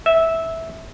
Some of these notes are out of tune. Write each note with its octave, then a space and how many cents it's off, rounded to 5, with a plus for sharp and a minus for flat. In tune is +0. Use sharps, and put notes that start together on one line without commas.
E5 -10